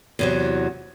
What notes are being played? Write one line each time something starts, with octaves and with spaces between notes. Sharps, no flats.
E2 C3 F#3